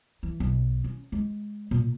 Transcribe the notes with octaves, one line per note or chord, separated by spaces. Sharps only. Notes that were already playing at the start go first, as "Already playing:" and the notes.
E3
B1
C#4
G#3
A#2